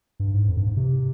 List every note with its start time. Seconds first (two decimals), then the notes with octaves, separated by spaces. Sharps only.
0.20 G2
0.34 G#2
0.48 F2
0.57 G2
0.67 G#2
0.77 C3